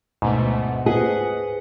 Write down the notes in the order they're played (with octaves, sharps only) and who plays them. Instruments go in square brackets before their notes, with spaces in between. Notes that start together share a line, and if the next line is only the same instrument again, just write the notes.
[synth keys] D2 B2 A3 [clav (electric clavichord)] G#2
[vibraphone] F#5
[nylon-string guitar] G#4 [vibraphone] B4 C5 [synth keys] D#5 F#5